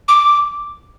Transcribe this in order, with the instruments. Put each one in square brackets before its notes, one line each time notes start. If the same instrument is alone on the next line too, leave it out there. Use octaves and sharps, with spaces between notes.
[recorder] D6